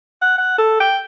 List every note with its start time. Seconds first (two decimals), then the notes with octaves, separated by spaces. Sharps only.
0.22 F#5
0.38 F#5
0.59 A4
0.80 G5